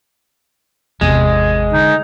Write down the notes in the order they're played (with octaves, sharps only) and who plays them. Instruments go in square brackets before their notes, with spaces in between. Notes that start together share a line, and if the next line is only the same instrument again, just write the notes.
[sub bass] G#1 [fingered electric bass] E2 C3 [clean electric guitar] G#3
[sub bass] D3 [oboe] D#4